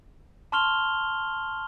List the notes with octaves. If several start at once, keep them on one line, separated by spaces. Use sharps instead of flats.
A5 C6 C#6 F6 F7 G7